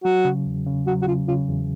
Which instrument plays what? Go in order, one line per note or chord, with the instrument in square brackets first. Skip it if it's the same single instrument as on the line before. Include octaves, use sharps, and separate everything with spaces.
[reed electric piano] F#3 [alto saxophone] F#4
[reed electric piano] C#3
E2
C#3
[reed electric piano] F#3 [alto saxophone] F#4
[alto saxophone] F#4
[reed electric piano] C#3 [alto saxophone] F4
[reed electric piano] C#3 [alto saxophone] F4
[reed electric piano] E2